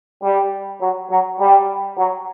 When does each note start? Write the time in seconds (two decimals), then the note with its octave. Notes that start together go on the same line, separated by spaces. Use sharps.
0.23 G3
0.81 F#3
1.10 F#3
1.40 G3
1.98 F#3